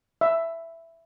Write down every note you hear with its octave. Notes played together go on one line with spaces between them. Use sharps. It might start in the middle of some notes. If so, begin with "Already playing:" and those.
E5